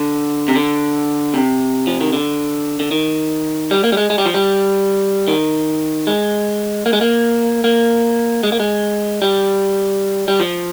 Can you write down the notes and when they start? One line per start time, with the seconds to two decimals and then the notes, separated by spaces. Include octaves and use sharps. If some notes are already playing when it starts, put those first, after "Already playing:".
Already playing: D3
0.48 C3
0.56 D3
1.34 C3
1.87 F3
2.01 D#3
2.13 D3
2.80 D3
2.91 D#3
3.71 G3
3.84 A#3
3.92 G3
3.97 G#3
4.10 G#3
4.18 G3
4.26 F3
4.34 G3
5.28 D#3
6.07 G#3
6.86 A#3
6.93 G#3
7.01 A#3
7.64 A#3
8.43 G#3
8.52 A#3
8.60 G#3
9.22 G3
10.28 G3
10.40 F3